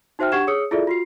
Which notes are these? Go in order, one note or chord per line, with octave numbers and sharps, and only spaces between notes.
D#4 F#4 C5 E5 G5 F6
D4 G4 F#5 C#6 G#6 E7
G#4 C#5 D#6 E6 C#7
E4 F4 G#4 A4 D5 E5
F4 F#4 C7